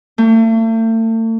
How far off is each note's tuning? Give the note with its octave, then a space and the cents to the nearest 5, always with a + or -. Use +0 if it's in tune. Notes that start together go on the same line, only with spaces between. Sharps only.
A3 +40